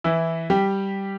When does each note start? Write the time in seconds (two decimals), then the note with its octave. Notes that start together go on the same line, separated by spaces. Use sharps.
0.04 E3 E4
0.50 G3 G4